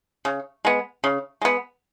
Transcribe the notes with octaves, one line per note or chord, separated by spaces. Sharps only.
C#3
G#3 B3
C#3
G#3 B3